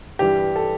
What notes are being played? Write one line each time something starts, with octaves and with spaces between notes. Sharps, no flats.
G2 E3 G3 G4
A4